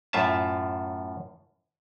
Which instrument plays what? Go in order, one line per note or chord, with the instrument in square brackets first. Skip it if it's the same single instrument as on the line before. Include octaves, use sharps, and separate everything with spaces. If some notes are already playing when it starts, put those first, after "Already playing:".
[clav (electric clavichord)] F#2 A2 F4 E5 A5